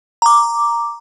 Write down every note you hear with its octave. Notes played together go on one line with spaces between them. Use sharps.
A#5 D6